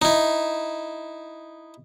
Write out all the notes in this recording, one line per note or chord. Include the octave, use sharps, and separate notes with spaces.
D#4 E4